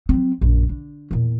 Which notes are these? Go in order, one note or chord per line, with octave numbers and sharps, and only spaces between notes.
F#3 C4
A#1 F#2
D3
E2 A#2